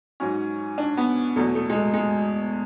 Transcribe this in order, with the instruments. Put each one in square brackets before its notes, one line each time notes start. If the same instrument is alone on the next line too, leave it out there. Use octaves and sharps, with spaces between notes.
[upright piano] G#2 F#3 C#4
D4
B3
E2 B2 F#3 A3
A3
G#3
A3
G#3